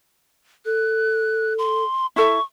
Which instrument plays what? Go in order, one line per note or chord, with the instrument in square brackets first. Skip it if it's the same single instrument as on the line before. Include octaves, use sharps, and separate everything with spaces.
[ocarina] A4 [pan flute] F#6
[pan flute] C6
[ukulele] E4 A4 E5 [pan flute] C#6